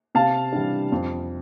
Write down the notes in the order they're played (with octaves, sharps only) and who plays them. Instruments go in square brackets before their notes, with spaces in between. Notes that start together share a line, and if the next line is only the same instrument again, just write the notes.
[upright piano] C3 F5 A5
E3 G3 D4
F2